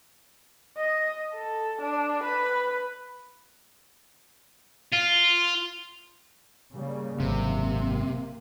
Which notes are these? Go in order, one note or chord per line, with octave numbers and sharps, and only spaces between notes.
D#5
A4
D4
B4
F4
C#3 G3 A#3
G#1 F#2 C3 A#3